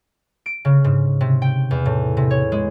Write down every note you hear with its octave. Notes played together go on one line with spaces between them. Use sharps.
D7
C#3
G#2
C3
G5
E2
A2
C3
C#5
G#3